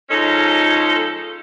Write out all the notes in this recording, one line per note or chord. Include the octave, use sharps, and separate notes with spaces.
F3 G#3 C#4 D#4 A4